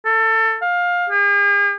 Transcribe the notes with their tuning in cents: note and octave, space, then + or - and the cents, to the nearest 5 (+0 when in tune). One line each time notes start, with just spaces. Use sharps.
A4 +25
F5 +20
G#4 -45